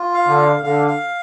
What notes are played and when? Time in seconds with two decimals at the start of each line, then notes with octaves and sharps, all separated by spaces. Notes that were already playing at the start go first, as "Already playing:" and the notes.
Already playing: F4
0.14 F5
0.26 D3
0.38 F5
0.63 D3 F5
0.87 F5